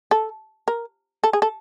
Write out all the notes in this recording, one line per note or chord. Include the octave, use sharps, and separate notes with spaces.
A4
A#4
A4
G#4
A4